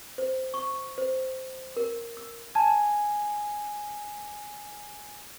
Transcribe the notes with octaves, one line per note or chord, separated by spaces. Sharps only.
C5
C#6
C5
A#4
E6
G#5 A5